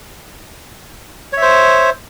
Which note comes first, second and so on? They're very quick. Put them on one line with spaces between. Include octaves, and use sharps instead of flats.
C#5 E5 C5